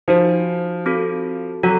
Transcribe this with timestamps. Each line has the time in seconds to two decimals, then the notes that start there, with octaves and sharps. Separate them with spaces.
0.08 F3 D#4 F#4 C5
0.86 C4 F#4 A4
1.63 F#3 F#4 A4